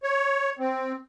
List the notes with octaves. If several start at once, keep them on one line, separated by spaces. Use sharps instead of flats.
C#5
C4